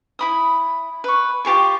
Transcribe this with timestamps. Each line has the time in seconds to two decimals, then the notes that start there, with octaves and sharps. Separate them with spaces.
0.19 E4 B5 D#6
1.04 B4 C#6
1.45 F4 G4 G#4 C#6